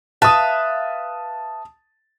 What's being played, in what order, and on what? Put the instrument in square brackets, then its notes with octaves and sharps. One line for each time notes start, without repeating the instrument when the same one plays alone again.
[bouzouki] B4 E5 F5 [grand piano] A5 D#6